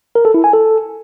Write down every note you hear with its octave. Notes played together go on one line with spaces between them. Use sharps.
A#4
A4
E4
G#5
A4